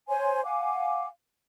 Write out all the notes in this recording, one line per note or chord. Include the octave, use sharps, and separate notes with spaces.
C5 C#5 G#5 C6
F5 F#5 G#5 D6